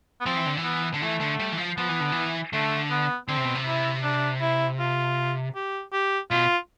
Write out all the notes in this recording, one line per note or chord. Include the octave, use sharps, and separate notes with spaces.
B3
F3 C4
E3
D3
E3
B3
D3
E3 A3
D3
G3
E3
F3
F3 B3
E3
D3
E3
D3 A3
B3
D3 C4
C3
B2
C3
E4
D4
E4
F4
G4
G4
B2 F4